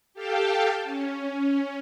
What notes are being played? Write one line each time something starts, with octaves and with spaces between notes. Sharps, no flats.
G4 A4 F5 G5 A5
C#4